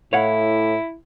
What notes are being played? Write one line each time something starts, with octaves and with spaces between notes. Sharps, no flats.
A2 E4 C#5 F5 F#5